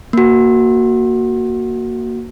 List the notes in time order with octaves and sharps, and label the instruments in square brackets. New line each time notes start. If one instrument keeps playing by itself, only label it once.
[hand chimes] A#3 F#4